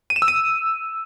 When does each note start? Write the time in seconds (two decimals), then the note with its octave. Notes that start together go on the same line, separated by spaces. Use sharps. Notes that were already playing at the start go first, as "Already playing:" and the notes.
0.10 D#7
0.16 E7
0.22 E6
0.28 D#7